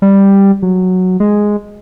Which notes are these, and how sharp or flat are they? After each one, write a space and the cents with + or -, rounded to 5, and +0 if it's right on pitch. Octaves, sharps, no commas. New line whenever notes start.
G3 +5
F#3 -5
G#3 +0